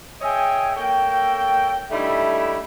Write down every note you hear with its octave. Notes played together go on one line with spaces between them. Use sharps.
G#4 C#5 D#5 E5 G5 G#5
A#3 A4 C#5 G5
D3 G3 A3 D#4 E4